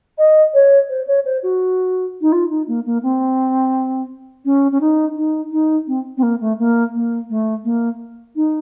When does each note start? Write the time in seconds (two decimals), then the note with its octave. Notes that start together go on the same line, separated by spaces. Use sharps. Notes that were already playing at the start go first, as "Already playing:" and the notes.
0.18 D#5
0.54 C#5
0.89 C5
1.07 C#5
1.25 C5
1.43 F#4
2.21 D#4
2.32 F4
2.50 D#4
2.68 A#3
2.86 A#3
3.03 C4
4.45 C#4
4.72 C#4
4.81 D#4
5.16 D#4
5.52 D#4
5.87 C4
6.17 C4
6.23 A#3
6.41 A3
6.59 A#3
6.94 A#3
7.30 A3
7.64 A#3
8.36 D#4